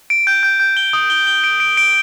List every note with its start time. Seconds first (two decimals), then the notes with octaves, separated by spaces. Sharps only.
0.10 D7
0.27 G6
0.43 G6
0.60 G6
0.77 G7
0.93 D#6
1.10 G7
1.27 G7
1.44 D7
1.60 D7
1.77 D7